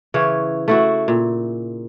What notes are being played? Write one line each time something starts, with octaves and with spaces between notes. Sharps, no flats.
C#3 E3 C#5
A3 E4 F#4
A#2